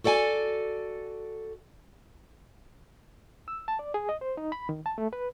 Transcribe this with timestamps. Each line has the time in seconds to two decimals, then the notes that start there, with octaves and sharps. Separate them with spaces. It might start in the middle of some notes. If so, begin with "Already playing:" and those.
0.04 F#4 A4 D5 G5 G#5
3.48 E6
3.68 A5
3.79 D5
3.94 G#4
4.09 D#5
4.21 C5
4.37 D#4
4.52 B5
4.69 D#3
4.86 A5
4.98 A3
5.13 B4